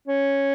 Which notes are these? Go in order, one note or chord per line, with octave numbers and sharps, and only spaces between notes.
C#4